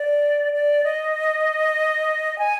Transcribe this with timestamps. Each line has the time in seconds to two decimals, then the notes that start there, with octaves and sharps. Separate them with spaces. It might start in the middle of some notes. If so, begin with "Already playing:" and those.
Already playing: D5
0.53 D5
0.84 D#5
2.39 G#5